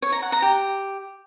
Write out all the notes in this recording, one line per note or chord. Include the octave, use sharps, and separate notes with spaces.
C#5
A#5
F#5
A#5
G4